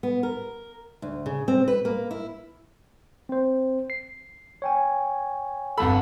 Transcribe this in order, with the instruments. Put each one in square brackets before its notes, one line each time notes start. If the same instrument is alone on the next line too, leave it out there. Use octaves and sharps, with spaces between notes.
[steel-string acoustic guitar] B3
A#4
D2
C#3
C4
B4
A#3
E4
[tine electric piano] C4 C5
C7
C#5 G5 G#5
[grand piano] G1 C2 B5 [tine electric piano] A4 F5 F#5